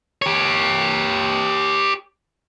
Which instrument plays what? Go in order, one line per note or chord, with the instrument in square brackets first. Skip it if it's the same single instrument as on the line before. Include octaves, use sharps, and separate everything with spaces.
[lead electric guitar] G4 C#5